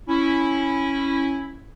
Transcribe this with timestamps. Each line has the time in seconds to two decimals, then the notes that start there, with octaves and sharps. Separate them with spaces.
0.09 C#4 E4